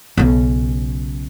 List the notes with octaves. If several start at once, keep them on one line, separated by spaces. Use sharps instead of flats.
B1 C#3